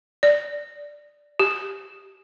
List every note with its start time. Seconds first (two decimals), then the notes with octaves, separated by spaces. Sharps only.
0.23 D5
1.39 G4